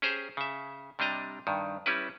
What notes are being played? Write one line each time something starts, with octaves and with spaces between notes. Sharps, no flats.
C#4 G4 G#4 C5 A#5
C#3 E5
C3 G3 D4 D#5 A#5
G2 D#3
G3 C#4 E4 B4